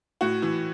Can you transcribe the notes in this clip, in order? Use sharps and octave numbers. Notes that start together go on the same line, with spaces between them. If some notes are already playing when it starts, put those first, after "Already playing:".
A2 F#4
E3